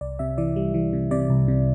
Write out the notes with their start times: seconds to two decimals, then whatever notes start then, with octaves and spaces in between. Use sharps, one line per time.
0.01 C2 D5
0.19 C3 E5
0.38 E3 D5
0.56 G3
0.74 E3
0.93 C3
1.11 C3 D5
1.30 C2
1.48 C3